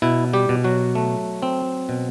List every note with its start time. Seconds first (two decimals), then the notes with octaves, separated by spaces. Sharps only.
0.02 B2 E4
0.33 G3 G4
0.49 B2
0.64 F#3 F#4
0.95 A3
1.42 C4
1.89 B2